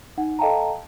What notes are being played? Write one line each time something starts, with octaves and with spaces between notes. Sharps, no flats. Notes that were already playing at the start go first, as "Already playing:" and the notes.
D#4 F#5
A4 D#5 F5 G5 A5 A#5